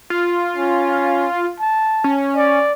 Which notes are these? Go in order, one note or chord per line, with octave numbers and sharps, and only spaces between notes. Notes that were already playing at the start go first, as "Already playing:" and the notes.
F4
C#4
A5
C#4
D5